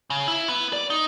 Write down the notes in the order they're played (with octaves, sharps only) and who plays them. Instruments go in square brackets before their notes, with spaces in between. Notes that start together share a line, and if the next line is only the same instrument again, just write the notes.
[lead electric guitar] C#3
E4
B3
D5
D#4